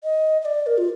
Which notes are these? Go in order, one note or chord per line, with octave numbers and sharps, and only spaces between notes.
D#5
D#5
D5
A#4
F4